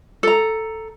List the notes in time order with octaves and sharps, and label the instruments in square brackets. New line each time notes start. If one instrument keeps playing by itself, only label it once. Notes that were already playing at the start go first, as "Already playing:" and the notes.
[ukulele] A4 A#5